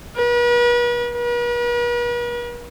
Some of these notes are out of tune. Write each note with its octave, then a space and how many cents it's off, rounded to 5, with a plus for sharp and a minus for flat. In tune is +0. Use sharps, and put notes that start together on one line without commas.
B4 -40
B4 -45